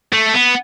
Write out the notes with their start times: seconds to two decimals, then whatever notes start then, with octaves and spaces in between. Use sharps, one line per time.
0.13 A3
0.34 B3